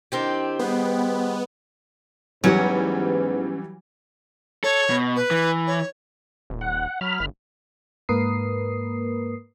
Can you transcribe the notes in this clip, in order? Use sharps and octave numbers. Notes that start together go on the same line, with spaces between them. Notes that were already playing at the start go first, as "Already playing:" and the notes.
D#3 C4 D4 E4 G4 D#5
G3 B3 G#4 D#5
G#2 E3 F#3 G3 B3 C#4 B4 F#5
A4 C#5
B2
B4
E3
C#5
D#1
F#5
F#3 B5 F6
G1
G#2 A#3 A#4 B4 D#6 C7